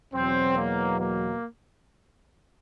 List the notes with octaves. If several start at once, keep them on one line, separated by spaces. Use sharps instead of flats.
E2 B2 F#3 C4
A#3
A#3